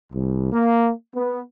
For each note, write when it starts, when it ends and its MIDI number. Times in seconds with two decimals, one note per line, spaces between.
0.13 0.52 36
0.52 0.92 58
1.15 1.41 59